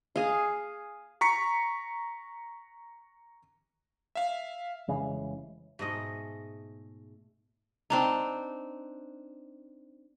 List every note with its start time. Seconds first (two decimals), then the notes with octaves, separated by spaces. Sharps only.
0.16 G#4 F5
1.21 A#5 C#6 B6 C#7
4.15 E5 F5
4.88 F1 C#3 E3 G#3
5.79 G#2 B2 G#3 A3 D#5
7.90 C4 D4 D#4